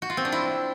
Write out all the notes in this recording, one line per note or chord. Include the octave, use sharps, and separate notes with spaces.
F#4
F4
C4
D4
E4